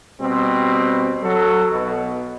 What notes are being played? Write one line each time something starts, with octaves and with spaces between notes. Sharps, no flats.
B2 G3 C4
F#3 A4
B1 B2